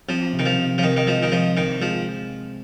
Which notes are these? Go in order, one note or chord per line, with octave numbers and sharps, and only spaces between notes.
F3 C4
C3
D#3
F3
C3
F3
C3 D#3
D#3
F3 G#3
D#3
C3 F3
D#3 C4
F3 G#3